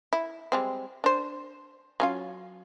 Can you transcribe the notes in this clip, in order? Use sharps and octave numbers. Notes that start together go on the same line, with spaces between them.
E4
G3 G#3 C4
D4 C5
F#3 C#4 F4